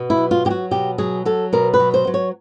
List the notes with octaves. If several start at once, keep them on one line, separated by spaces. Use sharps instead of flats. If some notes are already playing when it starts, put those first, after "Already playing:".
Already playing: B2
E4
F#3
F4
F#3 G4
F#4
B2 G4
F#3 G#4
F#3 A4
B2 A#4
B4
F#3
C5
F#3
C#5